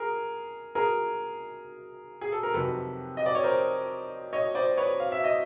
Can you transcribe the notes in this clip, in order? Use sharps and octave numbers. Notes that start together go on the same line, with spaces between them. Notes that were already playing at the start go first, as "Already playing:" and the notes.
Already playing: G#4 A#4
G#4 A#4
G#4
A4
A#4
F2 C3 D#3 F#3 A4 B4
D#5
D5
C#5
A#4 C5
C#5 D#5
C5 D5
B4 C#5
F5
E5
D#5